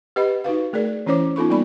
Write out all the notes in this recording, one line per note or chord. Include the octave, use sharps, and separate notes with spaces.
G4 B4 D#5 F#5 B5
D#4 F#4 B4 F5
A3 G#4 A#4 D5
E3 C#4 E4 C5 C#5 D6
B3 D#4 F4 A4 B5 C#6
G3 A#3 D#4 D5 B5